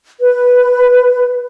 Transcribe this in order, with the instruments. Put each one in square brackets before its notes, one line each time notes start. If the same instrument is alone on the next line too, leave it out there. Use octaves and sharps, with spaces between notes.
[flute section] B4